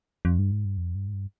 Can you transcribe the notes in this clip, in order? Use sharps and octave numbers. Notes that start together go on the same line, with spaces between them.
F2
G2
G#2
G2
F2
G2
G#2
G2